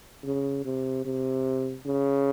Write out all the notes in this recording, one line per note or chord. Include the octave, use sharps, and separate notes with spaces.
C#3
C3
C3
C#3